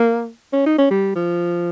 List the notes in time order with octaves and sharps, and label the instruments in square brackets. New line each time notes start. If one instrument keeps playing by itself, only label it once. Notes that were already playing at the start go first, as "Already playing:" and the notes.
Already playing: [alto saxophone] A#3
C#4
D#4
C#4
G3
F3